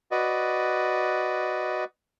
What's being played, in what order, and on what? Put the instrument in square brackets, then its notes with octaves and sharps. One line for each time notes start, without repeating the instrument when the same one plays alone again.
[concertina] F#4 B4 D5 D#5